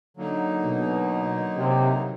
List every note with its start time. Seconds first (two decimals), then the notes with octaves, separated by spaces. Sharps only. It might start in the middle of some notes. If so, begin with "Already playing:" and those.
0.17 D3 F#3 A#3 D#4
0.63 B2
1.56 C3